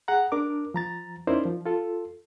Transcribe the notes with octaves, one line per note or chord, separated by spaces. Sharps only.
G#4 F#5 A#5
D4 A#4 D6
F3 A#5 A6
C#4 D#4 E4 A#4 C5 D5
F3
F4 A4